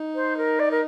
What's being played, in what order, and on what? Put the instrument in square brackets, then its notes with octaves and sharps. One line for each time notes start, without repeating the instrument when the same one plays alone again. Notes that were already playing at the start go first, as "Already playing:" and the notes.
Already playing: [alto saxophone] D#4
[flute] C5
A#4
D5
A#4